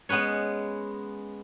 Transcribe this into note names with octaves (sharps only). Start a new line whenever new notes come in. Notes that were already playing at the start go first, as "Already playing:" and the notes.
G#3 B3 C#4 B4 C#5